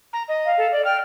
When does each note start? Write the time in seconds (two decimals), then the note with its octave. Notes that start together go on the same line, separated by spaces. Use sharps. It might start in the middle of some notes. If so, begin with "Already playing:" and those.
0.13 A#5
0.28 D#5
0.45 F5
0.58 A4
0.72 D5
0.85 G5 F6